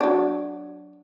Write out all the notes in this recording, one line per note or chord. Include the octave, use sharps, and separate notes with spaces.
F#3 D4